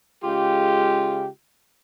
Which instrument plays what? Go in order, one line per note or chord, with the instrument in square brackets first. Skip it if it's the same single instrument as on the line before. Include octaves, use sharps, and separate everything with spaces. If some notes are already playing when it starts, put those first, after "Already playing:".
[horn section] C#3 G#3 F4 G4